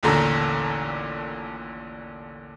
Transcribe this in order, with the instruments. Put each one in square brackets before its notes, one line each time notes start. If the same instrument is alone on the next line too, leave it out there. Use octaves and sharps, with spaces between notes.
[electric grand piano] A1 D#2 A#2 D3 A4 A#5